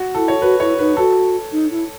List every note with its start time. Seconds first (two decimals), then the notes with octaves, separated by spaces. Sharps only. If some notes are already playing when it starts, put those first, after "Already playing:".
Already playing: F#4
0.14 E4 A4
0.28 C#5
0.42 F#4 B4
0.60 E4 C#5
0.79 D#4 B4
0.97 F#4 A4
1.52 D#4
1.71 E4